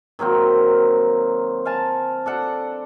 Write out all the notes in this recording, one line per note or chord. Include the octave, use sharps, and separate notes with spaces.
D#3 F#3 A#3 C4
F5 G#5 A5
D4 A4 F#5